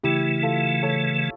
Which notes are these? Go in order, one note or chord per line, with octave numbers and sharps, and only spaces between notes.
C#3 E3 A3 E4 G4
F4 A4
A4 C#5